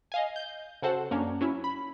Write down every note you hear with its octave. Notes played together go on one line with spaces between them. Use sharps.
D#5 F5 G#5
G6
C#3 F#4 A4 C5 F#5
F#2 A#3 C#4 D4
F#3 C#4 E4
B5